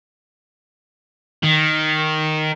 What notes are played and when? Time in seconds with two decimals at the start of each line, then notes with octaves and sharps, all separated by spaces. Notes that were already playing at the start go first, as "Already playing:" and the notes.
1.44 D#3